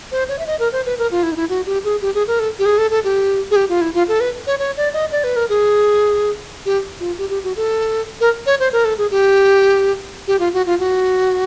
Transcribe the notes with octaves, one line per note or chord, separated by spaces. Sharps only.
C5
C#5
E5
D#5
A#4
C5
B4
A#4
F4
E4
D#4
E4
F#4
G4
G#4
G4
G#4
A#4
A4
G4
G#4
A4
A4
G4
G#4
G4
F4
E4
F4
A4
B4
C#5
C#5
D5
D#5
D5
B4
A#4
G#4
G4
F4
G4
G4
F#4
A4
A#4
C#5
C5
A#4
A4
G#4
G4
G4
F4
F#4
F4
F#4